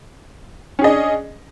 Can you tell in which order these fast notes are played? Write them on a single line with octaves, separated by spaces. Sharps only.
C#4 G#4 D#5 D4